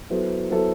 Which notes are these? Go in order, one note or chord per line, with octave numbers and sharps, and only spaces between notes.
F#3 B3 E4 A4 C5
F#3 B3 E4 A4 C5